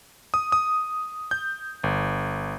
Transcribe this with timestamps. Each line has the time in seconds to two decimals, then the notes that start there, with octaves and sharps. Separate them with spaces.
0.34 D#6
0.52 D#6
1.31 G6
1.83 G1